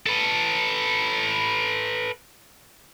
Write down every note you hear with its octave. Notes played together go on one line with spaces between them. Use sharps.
A4 B4